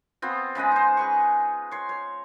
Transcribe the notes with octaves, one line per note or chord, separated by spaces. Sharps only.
B3 C4 F4
C#3 G#3 B4 D#5
D#4 C5
G#4 B4 C#6
C#5 C6
C#5